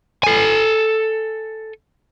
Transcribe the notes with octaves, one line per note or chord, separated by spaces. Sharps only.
A4 G#5